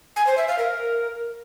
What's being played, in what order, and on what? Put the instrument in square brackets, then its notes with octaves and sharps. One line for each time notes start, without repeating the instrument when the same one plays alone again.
[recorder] G#5
C5
E5
F5
A#4